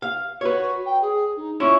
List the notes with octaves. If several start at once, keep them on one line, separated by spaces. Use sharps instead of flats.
F5
F#4 B4 C#5
G5
G#4
D#4
C#4 E4 F4 C#6